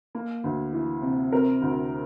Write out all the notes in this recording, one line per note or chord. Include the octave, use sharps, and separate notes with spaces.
A#3
D2
E3
C3
C4 A#4
D2